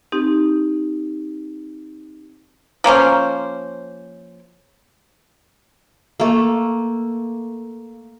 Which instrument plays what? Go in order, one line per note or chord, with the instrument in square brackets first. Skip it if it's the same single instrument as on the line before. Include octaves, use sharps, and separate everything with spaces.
[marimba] C4 D#4 G4
[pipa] F3 A#3 C#4 C5
[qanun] A3 A#3